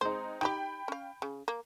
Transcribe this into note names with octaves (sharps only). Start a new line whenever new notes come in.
G#3 C4 D#4 C5
D#4 F#4 G4 G5 B5
C#4 F5
C#3
A#3